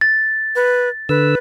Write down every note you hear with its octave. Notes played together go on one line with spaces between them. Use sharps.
A6
B4
D3 B4 E6